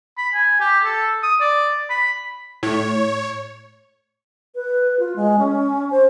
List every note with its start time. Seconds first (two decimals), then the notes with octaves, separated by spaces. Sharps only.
0.18 B5
0.34 G#5
0.61 G4
0.85 A4
1.23 D#6
1.41 D5
1.90 B5
2.63 A2 C#5
4.55 B4
4.99 F4
5.16 G#3
5.39 C#4
5.91 C5